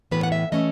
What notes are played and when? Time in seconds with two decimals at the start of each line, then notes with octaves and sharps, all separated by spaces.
0.11 A2 E3 B3 B4
0.23 F#5
0.32 E5
0.52 E3 A3 C#4 D#5